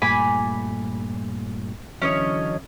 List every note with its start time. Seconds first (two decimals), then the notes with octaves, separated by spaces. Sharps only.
0.02 G2 A#2 A3 G#5 B5 D6
2.02 D3 E3 F#3 C#4 C#5 D#5